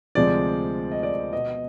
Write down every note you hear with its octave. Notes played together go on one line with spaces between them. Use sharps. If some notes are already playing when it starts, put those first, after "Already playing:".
D2 C3 F3 G#3 C4 D5
D#5
D5
B2 B3 D#5